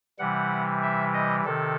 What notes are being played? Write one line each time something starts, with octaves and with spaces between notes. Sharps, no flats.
C3 E3 G3 F#5
E5
D#5
C3 D#3 A4